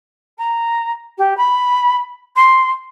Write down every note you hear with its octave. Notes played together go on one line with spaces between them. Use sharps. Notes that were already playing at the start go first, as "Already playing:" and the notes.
A#5
G4
B5
C6